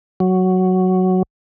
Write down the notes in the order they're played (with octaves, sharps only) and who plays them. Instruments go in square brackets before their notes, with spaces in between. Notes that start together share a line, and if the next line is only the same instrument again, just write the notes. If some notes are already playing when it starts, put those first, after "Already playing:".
[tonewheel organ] F#3